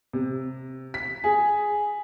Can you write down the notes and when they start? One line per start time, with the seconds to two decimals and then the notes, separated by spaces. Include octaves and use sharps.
0.13 C3
0.94 B6
1.24 G#4